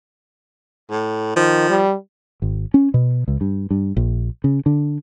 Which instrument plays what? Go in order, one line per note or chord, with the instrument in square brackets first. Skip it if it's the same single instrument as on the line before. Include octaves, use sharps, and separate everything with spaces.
[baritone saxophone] A2
[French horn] D#3 [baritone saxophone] F3
[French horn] G3
[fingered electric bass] G#1
C#4
B2
C#2
G2
G2
A#1
C#3
D3